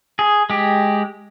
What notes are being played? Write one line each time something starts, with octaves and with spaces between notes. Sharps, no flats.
G#4
G#3 G4